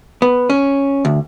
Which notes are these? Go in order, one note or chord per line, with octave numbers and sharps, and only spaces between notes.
B3
C#4
D2